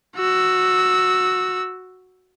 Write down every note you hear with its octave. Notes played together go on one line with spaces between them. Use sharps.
F#4 E6